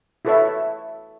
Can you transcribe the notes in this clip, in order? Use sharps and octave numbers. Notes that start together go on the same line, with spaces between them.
E4 F#4 A4 B4 C#5 E5